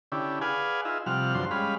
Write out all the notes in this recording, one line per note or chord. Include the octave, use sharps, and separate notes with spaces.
D3 C#4 E4 G4
G#4 B4 D5 F5 F#5 G#5
D#4 F4 G#4 E5
C3 F3 G3 F#5 F6
G2 D3 F3 F#3 C5 C6
G3 G#3 C#4 F5 B5